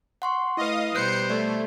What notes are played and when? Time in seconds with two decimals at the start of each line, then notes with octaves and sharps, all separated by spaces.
0.22 F#5 C6 C#6
0.57 A3 E4 B4 D#5 F5 D#6
0.95 B2 G3 B4 C5 F#6 G6 C7 C#7
1.30 A3 D5